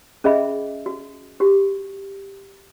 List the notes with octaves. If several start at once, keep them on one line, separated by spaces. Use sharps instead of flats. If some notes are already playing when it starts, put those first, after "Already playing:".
C#4 G#4 D#5 E5 B5
F#4
F#4 G4